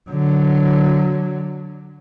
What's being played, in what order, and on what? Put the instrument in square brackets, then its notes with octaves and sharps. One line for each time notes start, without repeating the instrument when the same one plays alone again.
[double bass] D3 F#3